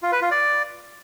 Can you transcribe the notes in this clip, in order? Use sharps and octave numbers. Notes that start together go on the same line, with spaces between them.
F4
B4
F4
D5